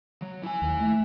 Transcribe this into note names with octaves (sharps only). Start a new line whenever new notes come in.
F#3
E4 G#5
D#2
A3